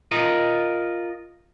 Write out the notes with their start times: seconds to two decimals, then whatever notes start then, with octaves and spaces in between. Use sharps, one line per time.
0.11 F4 A#4 D#5